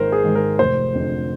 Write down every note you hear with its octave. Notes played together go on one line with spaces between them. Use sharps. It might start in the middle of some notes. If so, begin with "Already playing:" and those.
Already playing: G#1 G#2 D#3 A#4 C5
G#4
G#2 D#3
A#4
F1 C5
F2 D3